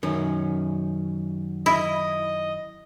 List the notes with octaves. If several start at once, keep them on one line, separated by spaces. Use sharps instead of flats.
F#2 D#3 C#4
E4 D#5